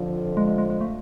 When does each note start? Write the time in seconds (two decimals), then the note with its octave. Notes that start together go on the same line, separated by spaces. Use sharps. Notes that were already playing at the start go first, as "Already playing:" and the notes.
Already playing: F2 D3 F3
0.37 G#3
0.47 G#3
0.58 G#3
0.70 G#3
0.81 A3